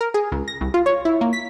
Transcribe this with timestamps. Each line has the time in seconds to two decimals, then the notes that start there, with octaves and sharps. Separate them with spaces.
0.01 A#4
0.14 G#4
0.32 C#2
0.48 A#6
0.61 C2
0.74 F4
0.86 C#5
1.05 E4
1.21 A#3
1.33 B6